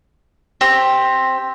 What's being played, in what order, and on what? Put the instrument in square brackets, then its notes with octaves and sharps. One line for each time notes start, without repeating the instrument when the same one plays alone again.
[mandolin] C4 G4